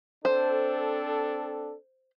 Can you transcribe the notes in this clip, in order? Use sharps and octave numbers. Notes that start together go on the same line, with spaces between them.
C4 D4 A4 C5